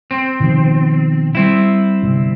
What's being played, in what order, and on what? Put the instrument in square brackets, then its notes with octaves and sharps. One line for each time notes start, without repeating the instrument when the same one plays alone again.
[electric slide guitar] C4
[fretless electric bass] B2 D#3 F3
[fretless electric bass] G3 [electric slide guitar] C4 E4
[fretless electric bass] G1 C3 G3